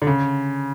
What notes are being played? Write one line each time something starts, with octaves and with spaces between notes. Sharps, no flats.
D3
C#3